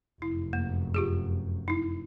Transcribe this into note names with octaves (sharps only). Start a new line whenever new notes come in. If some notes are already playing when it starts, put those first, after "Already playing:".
F1 F#2 E4
A#3
F4 G4 G#4
D#4 E4